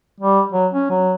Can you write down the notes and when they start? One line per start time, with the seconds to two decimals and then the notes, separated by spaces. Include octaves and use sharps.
0.20 G3
0.52 F#3
0.73 C#4
0.90 F#3